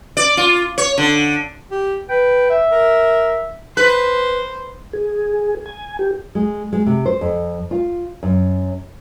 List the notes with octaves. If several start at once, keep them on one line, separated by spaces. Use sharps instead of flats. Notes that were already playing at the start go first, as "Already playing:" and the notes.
D5
F4
C#5
D3
G4
B4 G5
E5
A#4
B4 C5
G#4
G#5
G4
G#3
G#3
C3
C5
F2
F4
F#2